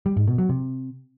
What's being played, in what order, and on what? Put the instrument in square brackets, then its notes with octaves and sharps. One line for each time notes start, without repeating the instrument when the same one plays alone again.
[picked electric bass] G3
G#2
B2
F#3
C3